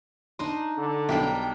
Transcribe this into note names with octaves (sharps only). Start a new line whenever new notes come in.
D4 D#4 D#5 C6
D3
B1 G3 D4 A#4 B4 G5